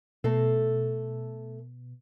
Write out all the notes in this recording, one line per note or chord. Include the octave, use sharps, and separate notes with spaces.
B2 A3 A4